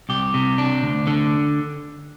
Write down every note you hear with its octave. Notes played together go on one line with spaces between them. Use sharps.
C2 G4
C3
D4
D2
D3